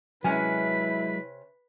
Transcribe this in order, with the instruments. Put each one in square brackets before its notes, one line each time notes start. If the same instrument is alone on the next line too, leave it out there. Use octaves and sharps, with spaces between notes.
[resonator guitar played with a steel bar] C3 C#4 G#5 [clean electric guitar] F#3 G#3 [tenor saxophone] E4 [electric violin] B4 B6